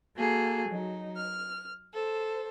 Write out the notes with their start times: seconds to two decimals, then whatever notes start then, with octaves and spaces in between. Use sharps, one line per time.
0.16 A#3 F#4 G#4 A4
0.69 F#3 D#4
1.17 F6
1.92 A4 C5